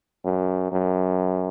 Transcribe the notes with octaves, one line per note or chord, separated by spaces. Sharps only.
F#2
F#2